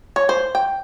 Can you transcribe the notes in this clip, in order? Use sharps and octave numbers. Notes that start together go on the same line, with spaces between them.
C#5
C5
G5